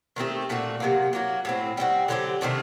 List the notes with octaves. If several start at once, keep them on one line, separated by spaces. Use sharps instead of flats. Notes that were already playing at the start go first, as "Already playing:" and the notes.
D#3 A3 C4 G4
A#2 A3 D4 F#4
C3 D#3 F#3 A#3
F#3 A#3 F#4
A2 F#3 C4
G3 C4 D#4 F#4
D3 F#3 C4 G4
C3 D#3 A3 D4